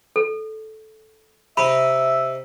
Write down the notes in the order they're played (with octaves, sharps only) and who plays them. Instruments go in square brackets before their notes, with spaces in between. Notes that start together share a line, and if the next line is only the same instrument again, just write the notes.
[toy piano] A4
[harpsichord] C3 D#4 [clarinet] E5 [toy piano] B5